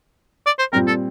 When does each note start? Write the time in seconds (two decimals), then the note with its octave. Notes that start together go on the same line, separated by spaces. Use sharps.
0.46 D5
0.59 C5
0.72 A#2 G3 C4 A#4
0.87 A4